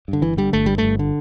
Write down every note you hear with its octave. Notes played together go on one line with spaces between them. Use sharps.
G2
D3
G1 E3
D3 G3
G1 A3
G2 G3
G1 A3
D3